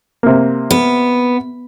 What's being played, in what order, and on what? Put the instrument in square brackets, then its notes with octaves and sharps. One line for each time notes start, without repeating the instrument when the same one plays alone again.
[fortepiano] C3 A#3
[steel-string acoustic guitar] B3